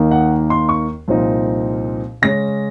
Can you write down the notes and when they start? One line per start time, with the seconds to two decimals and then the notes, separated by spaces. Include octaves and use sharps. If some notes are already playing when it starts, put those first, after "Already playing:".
Already playing: D#2 D#3 A#3 D#4
0.11 F#5
0.50 C6
0.69 C#6
1.08 C2 A#2 F3 C4 D#4
2.22 C#3 G#3 C#4 A#6